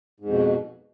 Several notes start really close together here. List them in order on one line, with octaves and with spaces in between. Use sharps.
G#2 F2 B2